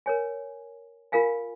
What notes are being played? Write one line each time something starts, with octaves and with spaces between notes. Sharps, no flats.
A#4 C#5 G#5
F4 A#4 F5 G#5